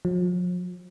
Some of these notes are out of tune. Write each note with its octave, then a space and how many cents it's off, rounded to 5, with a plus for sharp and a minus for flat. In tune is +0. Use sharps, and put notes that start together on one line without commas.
F3 +45